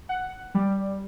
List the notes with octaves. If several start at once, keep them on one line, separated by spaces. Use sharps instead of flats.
F#5
G3